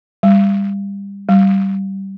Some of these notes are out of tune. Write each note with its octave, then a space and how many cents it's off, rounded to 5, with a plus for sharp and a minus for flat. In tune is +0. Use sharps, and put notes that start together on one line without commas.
G3 +25
G3 -15